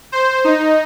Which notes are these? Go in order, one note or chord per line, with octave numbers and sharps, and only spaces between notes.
C5
D#4